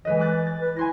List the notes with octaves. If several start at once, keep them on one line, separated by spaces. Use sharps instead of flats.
E3 G#3 B4 D#5
D6 F#6 A6
A6
B4
E4 G#5 C6 A#6